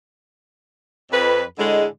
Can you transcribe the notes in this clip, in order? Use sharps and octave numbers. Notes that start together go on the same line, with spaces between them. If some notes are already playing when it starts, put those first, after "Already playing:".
F2 B4
A2 D3 G#3